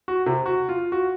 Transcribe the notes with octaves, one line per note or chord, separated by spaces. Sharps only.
F#4
C3
F#4
F4
F#4